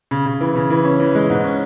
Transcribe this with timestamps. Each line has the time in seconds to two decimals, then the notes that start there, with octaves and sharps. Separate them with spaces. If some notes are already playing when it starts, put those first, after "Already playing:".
0.11 C#3
0.26 C#3
0.41 E3
0.55 C#3
0.70 E3
0.85 C#4
1.00 E3
1.15 G#3
1.30 G#2
1.44 C#4